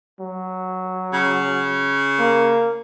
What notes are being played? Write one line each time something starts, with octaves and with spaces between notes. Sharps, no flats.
F#3
C#3
A#3